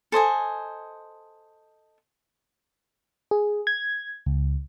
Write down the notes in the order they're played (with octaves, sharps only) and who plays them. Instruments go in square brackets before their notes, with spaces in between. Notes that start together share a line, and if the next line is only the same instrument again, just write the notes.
[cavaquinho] A4 C5 D#5 G#5
[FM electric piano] G#4
G#6
C#2